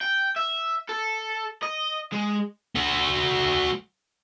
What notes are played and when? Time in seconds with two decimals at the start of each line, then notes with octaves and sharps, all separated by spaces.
0.01 G5
0.36 E5
0.89 A4
1.63 D#5
2.12 G#3
2.76 A3 F#4